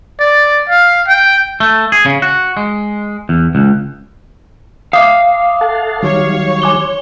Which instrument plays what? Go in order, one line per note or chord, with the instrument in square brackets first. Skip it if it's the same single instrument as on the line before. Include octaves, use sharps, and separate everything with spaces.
[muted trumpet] D5
F5
G5
[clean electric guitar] A3
G#4
C#3
F#4
G#3
E2
C#2
[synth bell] E5 D6 D#6 [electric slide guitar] F5
[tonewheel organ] A4 F#5 A5
[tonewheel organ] D#3 F#3 G3 [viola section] C#5
[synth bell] G#5 D6 G7